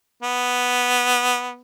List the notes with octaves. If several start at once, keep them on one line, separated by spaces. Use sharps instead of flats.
B3